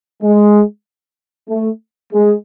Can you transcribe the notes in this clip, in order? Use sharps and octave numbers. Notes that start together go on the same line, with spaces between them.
G#3
A3
G#3